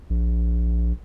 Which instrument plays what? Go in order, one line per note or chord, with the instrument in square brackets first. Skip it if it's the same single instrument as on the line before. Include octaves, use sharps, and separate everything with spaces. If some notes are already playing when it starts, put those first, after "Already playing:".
[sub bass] A#1